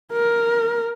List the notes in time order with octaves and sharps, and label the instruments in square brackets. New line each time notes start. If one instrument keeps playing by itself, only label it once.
[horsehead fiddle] A#4